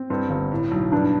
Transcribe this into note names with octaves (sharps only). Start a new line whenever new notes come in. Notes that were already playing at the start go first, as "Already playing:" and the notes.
Already playing: C4
G2 C4
G1
A2
B1
G2 D4